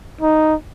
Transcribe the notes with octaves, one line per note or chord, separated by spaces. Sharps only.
D#4